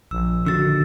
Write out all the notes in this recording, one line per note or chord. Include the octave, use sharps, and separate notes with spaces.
A#1 E6
D3 D#3 F#4 E6 A6